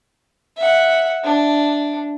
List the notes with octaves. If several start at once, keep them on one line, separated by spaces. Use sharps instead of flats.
E5 F#5
D4